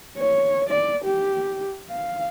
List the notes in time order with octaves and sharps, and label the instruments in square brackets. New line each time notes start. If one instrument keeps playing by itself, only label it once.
[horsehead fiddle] C#5
D5
G4
F5